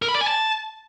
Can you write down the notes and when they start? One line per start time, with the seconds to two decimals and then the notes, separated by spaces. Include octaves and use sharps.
0.02 A#4
0.08 B5
0.15 D5
0.21 G#5
0.27 A5